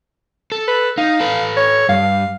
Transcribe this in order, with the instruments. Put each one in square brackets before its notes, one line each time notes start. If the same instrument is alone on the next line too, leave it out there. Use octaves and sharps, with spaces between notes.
[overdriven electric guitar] A4
[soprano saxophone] B4
[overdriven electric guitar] D#4 [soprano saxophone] F5
[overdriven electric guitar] A4 B4
[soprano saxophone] C#5
[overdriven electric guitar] G2 [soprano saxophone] F5